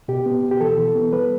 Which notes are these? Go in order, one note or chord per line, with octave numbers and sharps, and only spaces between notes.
B2 G4
B3
B2
G4
E3 A4
E3
B3
G3 B4